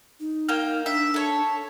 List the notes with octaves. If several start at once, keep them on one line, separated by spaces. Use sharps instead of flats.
D#4
A#3 G5 F6
D4 E5
A4 C#5